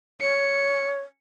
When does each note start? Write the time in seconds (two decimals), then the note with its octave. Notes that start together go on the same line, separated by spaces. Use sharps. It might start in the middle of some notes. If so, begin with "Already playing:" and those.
0.21 C#5 C#7